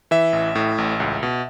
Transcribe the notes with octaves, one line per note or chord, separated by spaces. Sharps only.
E3 E5
A1
A2
A1
C#2
B2